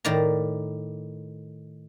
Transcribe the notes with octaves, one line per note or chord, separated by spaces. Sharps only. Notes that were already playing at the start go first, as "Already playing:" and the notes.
A2 D#3 D5 A#5